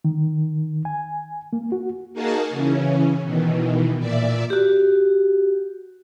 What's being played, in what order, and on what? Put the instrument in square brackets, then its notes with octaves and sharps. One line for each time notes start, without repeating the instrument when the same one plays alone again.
[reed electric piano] D#3
G#5
A#3
F#4
[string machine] A#3 D#4 F#4 G#4 A#4 A5
C#3 E3 C#4
B2 D#3 E3
A#2 D5 E5
[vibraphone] F#4 G4